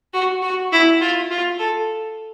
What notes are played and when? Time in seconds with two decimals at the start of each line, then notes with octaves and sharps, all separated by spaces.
0.14 F#4
0.42 F#4
0.72 E4
1.01 F4
1.31 F4
1.59 A4